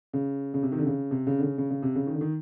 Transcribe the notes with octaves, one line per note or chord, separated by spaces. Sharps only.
C#3
C#3
C3
D#3
D3
C#3
C3
C#3
D3
C#3
C#3
C#3
C3
C#3
D#3
D3
D#3